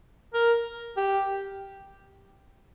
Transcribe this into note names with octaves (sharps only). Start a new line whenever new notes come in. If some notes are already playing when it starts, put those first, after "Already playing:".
A#4
G4